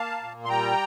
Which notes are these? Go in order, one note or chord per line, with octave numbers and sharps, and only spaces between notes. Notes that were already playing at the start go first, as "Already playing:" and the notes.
Already playing: A#3 F5 A5
A#2
C6
G3 G5 A#5